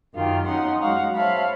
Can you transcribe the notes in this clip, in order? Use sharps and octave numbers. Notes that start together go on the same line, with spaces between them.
F#2 D#3 F4 G4
C#4 D#4 F#5 C6
F#3 G#3 F5 F#5 C#6
C5 C#5 E5 F5 A5 B5